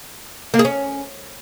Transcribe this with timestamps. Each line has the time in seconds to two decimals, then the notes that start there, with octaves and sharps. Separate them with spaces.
0.54 A#3
0.59 G#4
0.65 C#4